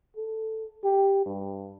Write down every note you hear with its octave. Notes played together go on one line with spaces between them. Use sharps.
A4
G4
G2